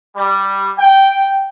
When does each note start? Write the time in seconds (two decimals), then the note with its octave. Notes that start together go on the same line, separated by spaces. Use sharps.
0.16 G3
0.78 G5